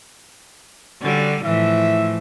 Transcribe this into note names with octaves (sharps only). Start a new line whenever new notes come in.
D3 G3 C#4 F#4 D5
A2 E3 F3 E5